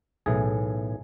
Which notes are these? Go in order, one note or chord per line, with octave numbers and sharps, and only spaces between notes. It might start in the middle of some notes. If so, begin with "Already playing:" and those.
B1 A2 E3 G#4